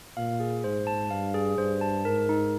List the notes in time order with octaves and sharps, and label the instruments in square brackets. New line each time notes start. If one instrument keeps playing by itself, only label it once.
[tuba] A#2 [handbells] F5
[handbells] G#4
[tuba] G#2 [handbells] C5
[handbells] A5
[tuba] G2 [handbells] F5
[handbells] G#4
[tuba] G2 [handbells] C5
[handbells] A5
[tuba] G#2 [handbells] A#4
[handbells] D#4